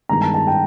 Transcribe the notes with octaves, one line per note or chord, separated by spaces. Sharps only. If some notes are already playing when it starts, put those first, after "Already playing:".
G2 D#3 G#3 B3 A#5
A5
A5
G5